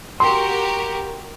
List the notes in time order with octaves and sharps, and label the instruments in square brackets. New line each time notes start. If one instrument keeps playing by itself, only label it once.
[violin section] F#4 G4 A#4 [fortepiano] C6